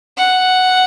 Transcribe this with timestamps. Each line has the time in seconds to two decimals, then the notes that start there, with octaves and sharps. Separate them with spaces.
0.17 F#5